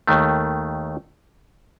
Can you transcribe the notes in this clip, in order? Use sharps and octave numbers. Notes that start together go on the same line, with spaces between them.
D#2 D#3 A3